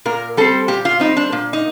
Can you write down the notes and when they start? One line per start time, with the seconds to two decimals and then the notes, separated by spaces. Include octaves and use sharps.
0.05 A#2 A#4
0.37 G3 C4 A4
0.68 A#2 G4
0.85 F4
1.00 G3 C4 D#4
1.17 D4
1.32 A#2
1.53 D#4